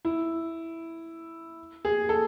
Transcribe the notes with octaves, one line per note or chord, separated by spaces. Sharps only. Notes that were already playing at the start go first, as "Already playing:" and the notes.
E4
G#4
A4